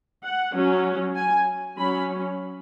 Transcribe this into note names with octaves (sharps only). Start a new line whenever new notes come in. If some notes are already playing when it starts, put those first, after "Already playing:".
F#5
F#3 C#4
G#5
F#3 C#4 B5